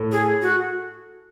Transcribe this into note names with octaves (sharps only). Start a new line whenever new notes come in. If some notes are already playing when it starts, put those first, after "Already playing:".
Already playing: A2
G#4
F#4